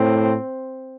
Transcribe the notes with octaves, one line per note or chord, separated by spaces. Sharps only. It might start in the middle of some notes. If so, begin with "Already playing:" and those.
Already playing: A2 C4